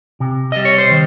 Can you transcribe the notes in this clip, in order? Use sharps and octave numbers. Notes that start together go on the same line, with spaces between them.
C3
G3 D#5
C#5
C5
D#3